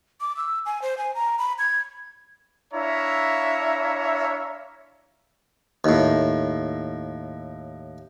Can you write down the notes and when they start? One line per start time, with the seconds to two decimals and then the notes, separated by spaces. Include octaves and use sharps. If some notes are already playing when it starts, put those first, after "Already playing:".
0.21 D6
0.37 E6
0.66 G#5
0.82 C5
0.98 G#5
1.15 A#5
1.38 B5
1.59 G#6
2.73 D4 E4 C#5 E5 F5 A#5
5.84 D#2 A2